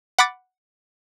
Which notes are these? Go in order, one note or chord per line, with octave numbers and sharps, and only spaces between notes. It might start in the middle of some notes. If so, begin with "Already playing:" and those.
F#5 B5 D6 A6